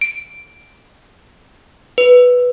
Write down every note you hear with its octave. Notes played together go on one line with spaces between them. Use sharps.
D7
B4